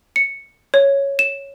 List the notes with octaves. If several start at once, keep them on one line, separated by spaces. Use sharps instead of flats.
C#7
C#5
E7